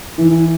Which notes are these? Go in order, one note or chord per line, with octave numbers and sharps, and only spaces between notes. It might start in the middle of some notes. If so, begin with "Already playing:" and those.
E3